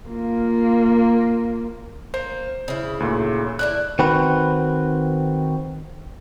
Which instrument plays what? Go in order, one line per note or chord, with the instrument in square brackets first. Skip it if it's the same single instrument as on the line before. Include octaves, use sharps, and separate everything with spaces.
[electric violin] A#3 F4
[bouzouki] A#3 [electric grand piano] C5
[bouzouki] C#3 E4
[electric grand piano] D2 A#2
[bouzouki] A2 D4 E4 [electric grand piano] F#6
[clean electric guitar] D#3 C4 F#4 B4